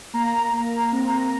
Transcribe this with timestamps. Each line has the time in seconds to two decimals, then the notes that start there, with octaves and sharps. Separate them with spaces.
0.14 A#3 A#5
0.52 A#3
0.92 C4